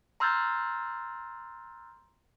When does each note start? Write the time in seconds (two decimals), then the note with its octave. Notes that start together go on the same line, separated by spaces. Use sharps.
0.20 A#5 C6 E6 F6 G6 A6